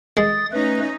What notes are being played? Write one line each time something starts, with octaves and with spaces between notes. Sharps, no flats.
G#3 D#6 A6
A3 C#4 D#4 B4